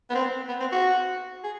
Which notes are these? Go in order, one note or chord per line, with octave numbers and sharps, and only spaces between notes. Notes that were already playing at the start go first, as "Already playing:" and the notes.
B3
C4
B3
C4
F#4
G#4